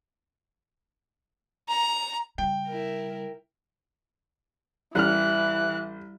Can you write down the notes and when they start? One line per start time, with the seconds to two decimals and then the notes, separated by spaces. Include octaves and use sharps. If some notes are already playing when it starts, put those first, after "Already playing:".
1.69 A#5
2.38 C#3 G3 G5
2.67 E4 A#4
4.95 A1 E3 G3 F6 F#6